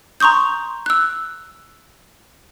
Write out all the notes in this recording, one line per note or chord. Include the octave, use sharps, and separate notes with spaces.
A#5 C6 C#6 D#6 G6
E6 F#6